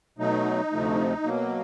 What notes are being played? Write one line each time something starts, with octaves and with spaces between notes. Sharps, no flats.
B2 F#3 A3 D#4
D2 C3 F3 A3
B2 F#3 A#3